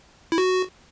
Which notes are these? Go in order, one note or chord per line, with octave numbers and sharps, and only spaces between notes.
E4
F#4